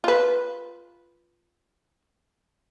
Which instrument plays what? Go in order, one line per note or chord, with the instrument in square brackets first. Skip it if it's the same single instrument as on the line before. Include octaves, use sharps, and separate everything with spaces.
[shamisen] F4 B4